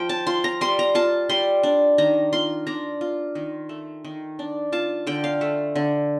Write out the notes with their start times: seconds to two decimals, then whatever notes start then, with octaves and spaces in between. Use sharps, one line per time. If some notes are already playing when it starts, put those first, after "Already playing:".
Already playing: F3 F4 G5
0.09 A5
0.27 F4 C6
0.44 A#5
0.61 G3 C6
0.79 A#5
0.95 F4 A5
1.29 G3 C6
1.63 D4
1.98 D#3 A#5
2.33 F4 C6
2.67 D4 A#5
3.01 F4
3.35 D#3
3.69 A3
4.04 D#3
4.39 D4
4.72 F4 A5
5.07 D3 G5
5.24 F5
5.41 A3
5.75 D3